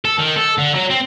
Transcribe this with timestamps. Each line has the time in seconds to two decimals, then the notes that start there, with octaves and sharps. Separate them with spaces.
0.05 A4
0.19 D#3
0.37 A4
0.59 D3
0.75 F#3
0.91 C4